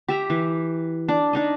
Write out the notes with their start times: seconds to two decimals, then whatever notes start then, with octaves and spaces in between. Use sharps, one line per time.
0.09 G4 E5 A#5
0.30 E3
1.09 D4
1.33 D4 D#4 D#5